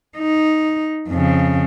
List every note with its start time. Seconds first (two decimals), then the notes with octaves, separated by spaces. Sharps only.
0.18 D#4
1.08 F2 C#3